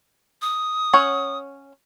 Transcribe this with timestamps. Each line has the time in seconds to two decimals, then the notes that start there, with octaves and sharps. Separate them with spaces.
0.42 D#6
0.93 C#4 C#5 F#5